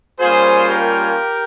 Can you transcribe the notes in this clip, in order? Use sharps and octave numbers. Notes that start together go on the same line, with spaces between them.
G3 A#3 C#4 F4 G#4 C5
G4 A#4